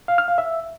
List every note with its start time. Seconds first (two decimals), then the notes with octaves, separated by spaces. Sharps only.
0.08 F5
0.18 F6
0.28 F5
0.38 E5